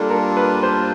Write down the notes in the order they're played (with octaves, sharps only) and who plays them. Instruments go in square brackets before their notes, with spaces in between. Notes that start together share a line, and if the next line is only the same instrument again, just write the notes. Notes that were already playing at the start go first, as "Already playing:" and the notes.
Already playing: [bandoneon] G3 A#3 D4 F4 [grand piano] A4
[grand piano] A#4
B4
C5